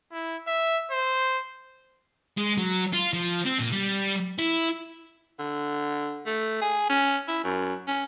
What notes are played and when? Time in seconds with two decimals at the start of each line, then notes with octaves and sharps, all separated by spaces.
0.12 E4
0.47 E5
0.91 C5
2.38 G#3
2.58 F#3
2.93 F4
3.13 F3
3.45 C4
3.59 A#2
3.72 G3
4.38 E4
5.39 D3
6.26 A3
6.62 G#4
6.90 C#4
7.28 E4
7.44 F#2
7.88 C#4